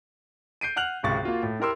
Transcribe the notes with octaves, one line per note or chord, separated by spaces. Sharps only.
G6 C7 D7 D#7
F#5 F6 F#6 F7 F#7
G#1 C#2 C3 C#6 A6
A#3 F4 F#4
A2
E4 G4 A#4 C6 E6